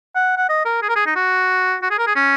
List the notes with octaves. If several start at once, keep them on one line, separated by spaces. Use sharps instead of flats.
F#5
F#5
D#5
A#4
G#4
A#4
G#4
D#4
F#4
F#4
G#4
A#4
G#4
C#4